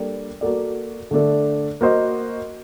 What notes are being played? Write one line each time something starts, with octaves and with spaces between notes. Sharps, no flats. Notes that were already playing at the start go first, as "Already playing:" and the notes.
Already playing: G3 A#3 D4 A4
A#3 F#4 A4 D5
D3 A3 D4 A4
A#3 F#4 C5 D#5